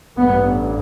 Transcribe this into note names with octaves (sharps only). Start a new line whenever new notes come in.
A1 G2 B3